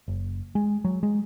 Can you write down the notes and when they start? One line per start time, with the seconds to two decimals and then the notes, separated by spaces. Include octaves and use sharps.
0.08 F#1
0.55 G#3
0.85 F#3
1.03 G#3